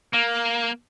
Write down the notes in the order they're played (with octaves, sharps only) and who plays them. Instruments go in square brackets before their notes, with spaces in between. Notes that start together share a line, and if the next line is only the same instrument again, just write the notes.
[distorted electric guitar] A#3